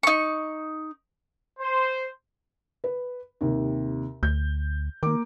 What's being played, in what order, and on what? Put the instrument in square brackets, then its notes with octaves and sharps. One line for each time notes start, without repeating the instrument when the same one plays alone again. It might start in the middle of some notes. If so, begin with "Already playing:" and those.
[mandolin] D#4 C#6
[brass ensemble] C5
[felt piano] B4
D#2 C3
[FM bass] D2 [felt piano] G6
[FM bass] D#3 [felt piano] A#3 D6